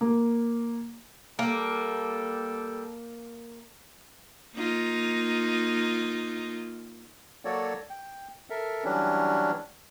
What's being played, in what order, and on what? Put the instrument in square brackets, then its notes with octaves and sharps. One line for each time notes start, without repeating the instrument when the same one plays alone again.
[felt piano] A#3
[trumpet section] G3 A4 G5 [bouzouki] A#3
[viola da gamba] A#3 D#4 F4
[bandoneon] F#3 A#3 F#4 A4 C#5 D5
G5
A4 A#4 E5
E3 F#3 G3 C#4 D4